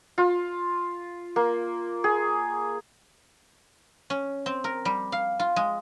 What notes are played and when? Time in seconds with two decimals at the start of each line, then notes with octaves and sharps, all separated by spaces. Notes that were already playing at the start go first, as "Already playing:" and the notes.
0.18 F4
1.36 A#3
2.04 G#4
4.10 C#4
4.46 C4
4.64 A#4
4.85 G3
5.12 F5
5.40 F4
5.56 G#3